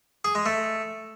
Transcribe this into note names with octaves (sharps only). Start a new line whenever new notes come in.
G#4
G#3
A3